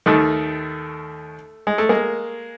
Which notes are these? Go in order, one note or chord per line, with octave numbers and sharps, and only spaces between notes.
D#2 D#3 A3
G#3
A3
G#3 A#3